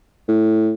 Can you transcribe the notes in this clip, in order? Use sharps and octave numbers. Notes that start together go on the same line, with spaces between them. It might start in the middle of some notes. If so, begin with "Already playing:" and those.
A2